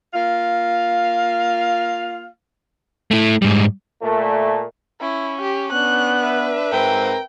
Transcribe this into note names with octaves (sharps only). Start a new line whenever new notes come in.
A#3 F4 F5
A3 E4
G#2 G3
A#2 A3
C#4 E4
G4
B3 D4 F#6
B4 E5
G#2 C4 A#4 G5